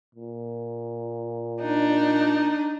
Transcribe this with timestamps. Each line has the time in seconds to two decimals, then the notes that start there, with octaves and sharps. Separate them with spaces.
0.15 A#2
1.59 D4 D#4